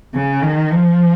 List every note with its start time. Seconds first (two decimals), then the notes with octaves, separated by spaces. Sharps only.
0.14 C#3
0.42 D#3
0.70 F3